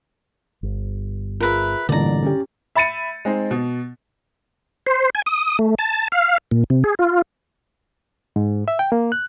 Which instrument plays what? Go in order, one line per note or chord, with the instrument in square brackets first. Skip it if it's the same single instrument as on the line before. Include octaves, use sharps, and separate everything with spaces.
[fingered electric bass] G1
[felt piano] F4 G#4 [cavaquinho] A#4 B4 E5
[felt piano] A1 G2 A#2 [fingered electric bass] D3 [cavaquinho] D5 A#5
[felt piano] C#4 G4
[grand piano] E5 B5 A6 C#7 D#7
G#3 C4 D#4
B2
[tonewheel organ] C5
G#5
D#6
A3
A5
F5
A#2
C3
G#4
F4
[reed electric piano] G#2
E5
G5
A#3
F#6